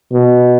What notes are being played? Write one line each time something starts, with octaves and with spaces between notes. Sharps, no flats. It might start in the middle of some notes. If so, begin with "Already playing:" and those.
B2